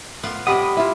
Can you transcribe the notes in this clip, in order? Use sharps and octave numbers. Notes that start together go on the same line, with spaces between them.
A2 B3 F4
C3 G3 G4 D#5 F#5 G#5 B5 D#6
E4 F4